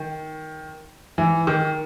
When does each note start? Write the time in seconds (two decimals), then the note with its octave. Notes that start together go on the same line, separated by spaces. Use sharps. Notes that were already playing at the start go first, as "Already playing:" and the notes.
Already playing: D#3
1.18 E3
1.47 D#3